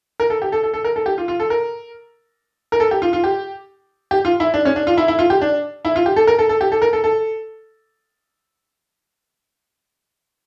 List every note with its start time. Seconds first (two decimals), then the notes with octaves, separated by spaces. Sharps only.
0.20 A#4
0.30 A4
0.42 G4
0.52 A4
0.63 A4
0.74 A4
0.84 A#4
0.96 A4
1.06 G4
1.18 F4
1.28 F4
1.40 A4
1.50 A#4
2.72 A#4
2.80 A4
2.91 G4
3.02 F4
3.13 F4
3.24 G4
4.11 G4
4.25 F4
4.40 E4
4.54 D4
4.65 C#4
4.76 D4
4.87 F4
4.98 E4
5.08 E4
5.19 F4
5.30 G4
5.42 D4
5.85 E4
5.96 F4
6.06 G4
6.16 A4
6.27 A#4
6.39 A4
6.49 A4
6.61 G4
6.72 A4
6.82 A#4
6.93 A4
7.04 A4